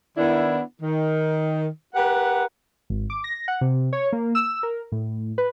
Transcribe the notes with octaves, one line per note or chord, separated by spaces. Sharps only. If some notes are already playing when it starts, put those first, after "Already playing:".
D#3 B3 D4 E4
D#3
G4 A#4 B4 F#5
G#1
D6
A#6
F#5
C3
C#5
A#3
E6
A#4
A2
B4